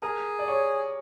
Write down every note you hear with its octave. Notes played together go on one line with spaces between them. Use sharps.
G#4 A#4
D5
C#5